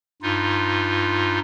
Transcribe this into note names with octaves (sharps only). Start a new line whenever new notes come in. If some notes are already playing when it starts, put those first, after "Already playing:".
G2 D#4 F4